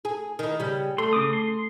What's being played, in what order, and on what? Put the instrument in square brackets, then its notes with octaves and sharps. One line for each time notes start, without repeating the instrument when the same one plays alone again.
[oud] G#4
D#3 E4
C#3 G3
[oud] A3 [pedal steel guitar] C6
[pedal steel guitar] C#3 D6 D#6
C6